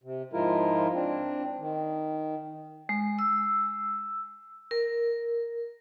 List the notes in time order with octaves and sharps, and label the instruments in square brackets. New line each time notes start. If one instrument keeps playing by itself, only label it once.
[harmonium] C3
G#2 F3 G#3 E4 F4 A#4
C4 D4
D#3
[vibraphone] G#3
E6
A#4